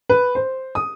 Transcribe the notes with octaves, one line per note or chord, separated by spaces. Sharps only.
B4
C5
D#6